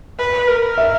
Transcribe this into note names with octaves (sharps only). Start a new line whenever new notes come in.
B4
A#4
E5